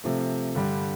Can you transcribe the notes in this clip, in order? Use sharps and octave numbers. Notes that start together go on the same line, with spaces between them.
C3 F3 A3
G2 D3 G3